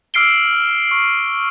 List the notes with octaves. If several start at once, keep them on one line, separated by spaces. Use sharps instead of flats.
D6 E6 F6 C7 D7 G7
C#6